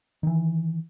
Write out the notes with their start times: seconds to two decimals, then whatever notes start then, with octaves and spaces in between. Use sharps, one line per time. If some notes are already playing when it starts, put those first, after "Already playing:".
0.23 D#3 E3